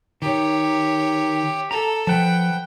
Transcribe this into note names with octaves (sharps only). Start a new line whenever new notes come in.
D#3 G4 C#5
A4 A#5
F3 B4 F#5 G5 A5